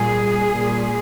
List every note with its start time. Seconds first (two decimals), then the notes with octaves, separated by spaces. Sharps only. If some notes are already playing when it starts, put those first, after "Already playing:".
Already playing: A#2 G3 G#4
0.51 A#2 G3